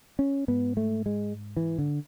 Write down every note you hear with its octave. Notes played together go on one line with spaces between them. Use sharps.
C#4
G#2 B3
A3
G#3
E3
D3